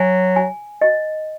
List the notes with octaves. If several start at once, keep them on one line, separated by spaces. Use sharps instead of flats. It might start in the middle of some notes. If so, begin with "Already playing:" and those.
Already playing: F#3 G#5
G#5
D#5